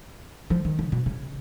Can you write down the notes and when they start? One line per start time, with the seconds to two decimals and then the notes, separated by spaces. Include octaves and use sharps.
0.50 F3
0.65 D#3
0.79 C#3
0.92 B2
1.06 C#3